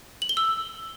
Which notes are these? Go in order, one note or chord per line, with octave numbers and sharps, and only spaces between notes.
F#7
G7
E6